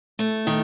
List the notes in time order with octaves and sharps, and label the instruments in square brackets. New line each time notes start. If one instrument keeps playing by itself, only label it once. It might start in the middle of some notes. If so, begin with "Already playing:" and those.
[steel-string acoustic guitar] A3
D#3